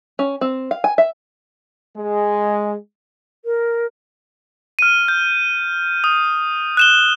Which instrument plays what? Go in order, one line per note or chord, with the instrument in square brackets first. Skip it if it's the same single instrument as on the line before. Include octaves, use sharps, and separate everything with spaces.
[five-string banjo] C#4
C4
F5
G#5
E5
[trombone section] G#3
[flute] A#4
[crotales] F6 D#7
G6
D#6
F#6 E7 G7